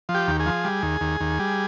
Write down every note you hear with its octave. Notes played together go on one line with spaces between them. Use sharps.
F3
G4
D#2
G#4
F3
G3
D#2
D#2
D#2
G3